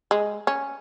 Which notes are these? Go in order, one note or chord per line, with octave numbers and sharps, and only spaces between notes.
G#3
C#4